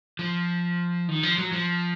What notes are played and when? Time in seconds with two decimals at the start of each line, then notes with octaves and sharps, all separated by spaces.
0.19 F3
1.08 D#3
1.23 F3
1.38 F#3
1.53 F3